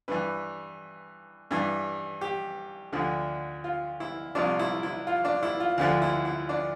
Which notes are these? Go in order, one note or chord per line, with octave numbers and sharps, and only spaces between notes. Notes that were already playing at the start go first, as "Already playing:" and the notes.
G2 E3 B4
G2 E3
G4
D2 D3 F3
F4
E4
C2 C3 F3 D4
E4
E4
F4
D4
E4
F4
D2 D3 F3
E4
E4
D4